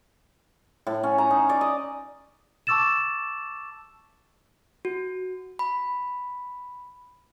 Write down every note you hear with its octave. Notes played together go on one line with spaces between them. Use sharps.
A2
C#4
A#5
D#4
D5
D#5
A5 C#6 D6 E6 A6 E7
F#4
B5